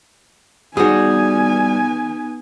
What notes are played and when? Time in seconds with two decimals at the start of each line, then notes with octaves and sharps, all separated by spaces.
0.77 G3 B3 D#4 F#4 G#4 G#5 D#6